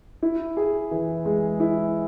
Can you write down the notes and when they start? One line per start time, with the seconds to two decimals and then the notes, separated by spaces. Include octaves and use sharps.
0.22 E4
0.57 G#4
0.91 E3
1.25 G#3
1.60 E4